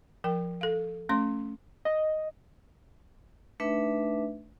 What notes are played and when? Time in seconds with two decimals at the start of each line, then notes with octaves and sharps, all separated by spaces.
0.24 F3 A#4 G5
0.61 A4 F5
1.09 A3 C#4 C6
1.85 D#5
3.60 A3 D4 D#4 B4 E5